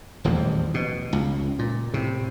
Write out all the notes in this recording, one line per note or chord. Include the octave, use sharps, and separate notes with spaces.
D#1 A1 E2 F3
B2
C#2
A#2
A2 C3